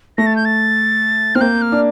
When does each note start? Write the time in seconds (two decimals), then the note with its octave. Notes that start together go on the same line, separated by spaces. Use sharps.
0.18 A3 A#6
0.26 A6
0.36 G6
0.45 A6
1.35 C4 F6
1.41 A#3 G6
1.62 F6
1.72 D4